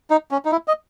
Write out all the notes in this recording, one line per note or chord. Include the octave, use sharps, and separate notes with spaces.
D#4
C#4
D#4
E4
D#5